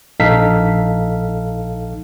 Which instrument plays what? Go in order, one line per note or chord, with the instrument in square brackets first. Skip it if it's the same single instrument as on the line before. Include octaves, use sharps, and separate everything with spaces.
[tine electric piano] A#1 D#4 A4 F5 B6